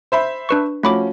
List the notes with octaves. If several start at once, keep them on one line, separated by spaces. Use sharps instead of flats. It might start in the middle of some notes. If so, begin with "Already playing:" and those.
C5 E5 B5
D4 B4 C#6
F3 A3 C#4 F#4 B5 D6